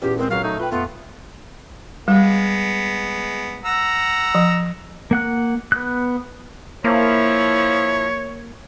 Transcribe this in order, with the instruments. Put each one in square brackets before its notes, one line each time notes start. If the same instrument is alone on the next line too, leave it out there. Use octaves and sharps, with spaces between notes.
[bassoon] E2 [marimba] A#2 C#4 F4 [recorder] G4
[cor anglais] G#3 [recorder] C4 [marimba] A#4
[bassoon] C#2 [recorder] F#3 [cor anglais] F5
[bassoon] A3 [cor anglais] D#4
[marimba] F4 G5 [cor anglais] B4
[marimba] F2 [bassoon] A3 [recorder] B3 [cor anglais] F4
[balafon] G3 [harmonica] G#3 B3
[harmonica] F#5 A#5 E6
[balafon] F3
[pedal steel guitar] A#3 F#5 F#6
B3 F#6
[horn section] F3 E4 [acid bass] A#3 [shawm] C#5